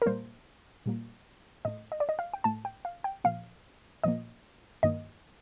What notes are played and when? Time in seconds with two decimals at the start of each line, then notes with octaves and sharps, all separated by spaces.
0.02 A#4
0.06 A#2 G3 A#3 C5
0.86 A#2 G3 A#3
1.65 A2 A3 D#5
1.92 D#5
2.00 D5
2.09 D#5
2.19 F5
2.33 G5
2.44 A2 A3 A5
2.65 G5
2.85 F5
3.04 G5
3.24 A#2 F3 A#3 F5
4.03 A#2 F3 A#3 D#5
4.83 G2 D#3 A#3 D#5